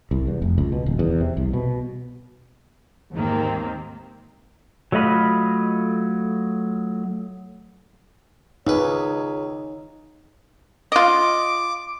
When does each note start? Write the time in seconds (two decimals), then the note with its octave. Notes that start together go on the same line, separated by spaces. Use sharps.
0.11 C2
0.27 E2
0.42 F1
0.58 C#2
0.72 B2
0.86 D#1
0.99 E2
1.21 C3
1.37 C2
1.53 B2
3.14 D#2 G#2 D#3 A#3 C4
4.92 F#3 A3 F4 D#5 B5
8.67 C#2 D#4 B4 C#5
10.92 F4 D#5 D6